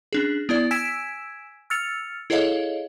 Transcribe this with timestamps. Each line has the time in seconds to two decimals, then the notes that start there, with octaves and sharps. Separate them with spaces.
0.13 C#4 D4 G#4
0.49 B3 E4 D5
0.71 G#5 E6 G#6 B6 D7 E7
1.70 E6 F6 A6 C#7 F7
2.30 E4 G#4 A4 C#5 D#5 F5